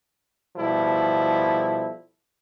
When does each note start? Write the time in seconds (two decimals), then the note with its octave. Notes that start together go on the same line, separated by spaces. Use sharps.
0.57 B2 F3 G3 E4 A4